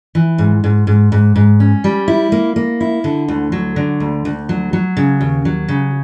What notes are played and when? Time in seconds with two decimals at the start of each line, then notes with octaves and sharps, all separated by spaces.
0.15 E3
0.38 G#2
0.64 G#2
0.87 G#2
1.12 G#2
1.36 G#2
1.60 C#4
1.84 G3
2.08 E4
2.32 A#3
2.56 A#3
2.81 E4
3.04 D3
3.28 D2
3.52 F#3
3.76 D3
4.00 D2
4.25 D2
4.49 F#3
4.73 F#3
4.97 C#3
5.21 D#2
5.45 F#3
5.68 C#3